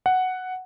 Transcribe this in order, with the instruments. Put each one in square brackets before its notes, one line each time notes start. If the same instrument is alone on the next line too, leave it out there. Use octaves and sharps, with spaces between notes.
[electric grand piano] F#5